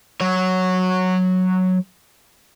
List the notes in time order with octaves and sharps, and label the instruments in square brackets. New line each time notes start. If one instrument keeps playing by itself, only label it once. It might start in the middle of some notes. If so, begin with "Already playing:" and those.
[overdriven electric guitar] F#3 C#5